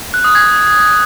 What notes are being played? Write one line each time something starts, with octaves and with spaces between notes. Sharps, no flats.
F#6
D#6
G#6